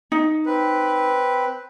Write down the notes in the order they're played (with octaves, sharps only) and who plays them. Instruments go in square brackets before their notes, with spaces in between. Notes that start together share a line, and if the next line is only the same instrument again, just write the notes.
[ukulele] D#4
[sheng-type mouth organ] C4 B4